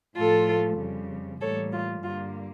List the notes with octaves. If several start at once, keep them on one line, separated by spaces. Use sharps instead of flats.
A2 F3 A3 F4 A4
F2 C#3 G3
A2 E3 G3 A#3 A4 C#5
F4
G2 D3 G3 A#3 F4